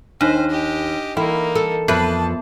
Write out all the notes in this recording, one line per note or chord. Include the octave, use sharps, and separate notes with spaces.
D#2 D4 D#4 C5
G4 D#5
E3 A#3 D#4 E4
A4
F2 B3 A4 B4 A5